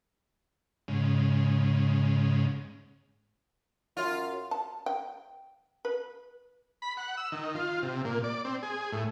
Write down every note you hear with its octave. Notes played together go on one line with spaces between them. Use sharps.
G#2 C#3
F#2 F4
A5
G5
B4
B5
F#5
E6
D#3
F4
C3
A#2
D5
C4
G#4
A2